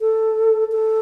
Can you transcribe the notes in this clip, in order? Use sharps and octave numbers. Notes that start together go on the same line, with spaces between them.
A4
A4